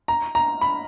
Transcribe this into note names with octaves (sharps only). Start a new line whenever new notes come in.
A#5
A#5
B5